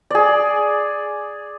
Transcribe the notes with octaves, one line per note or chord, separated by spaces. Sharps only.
G#4 D5